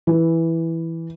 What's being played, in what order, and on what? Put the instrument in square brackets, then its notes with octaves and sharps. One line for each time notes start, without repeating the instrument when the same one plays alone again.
[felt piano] E3